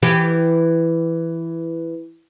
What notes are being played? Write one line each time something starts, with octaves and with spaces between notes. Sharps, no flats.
E3 G4